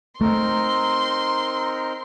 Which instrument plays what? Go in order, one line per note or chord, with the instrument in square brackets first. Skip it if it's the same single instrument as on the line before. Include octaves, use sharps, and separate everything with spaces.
[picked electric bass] A3 [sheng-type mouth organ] C4 D#4 A#4 [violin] C6